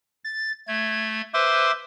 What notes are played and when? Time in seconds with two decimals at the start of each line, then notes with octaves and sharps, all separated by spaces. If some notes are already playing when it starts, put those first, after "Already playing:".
0.24 A6
0.68 A3 G#6
1.34 B4 C5 E5 C6 D6